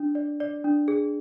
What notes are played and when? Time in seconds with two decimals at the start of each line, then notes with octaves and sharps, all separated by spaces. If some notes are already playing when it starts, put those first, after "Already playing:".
Already playing: D4
0.15 D5
0.40 D5
0.64 D4
0.88 G#4